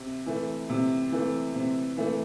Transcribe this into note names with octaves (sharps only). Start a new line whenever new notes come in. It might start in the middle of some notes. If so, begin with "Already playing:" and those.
Already playing: C3
E3 A3
C3
E3 A3
C3
E3 A3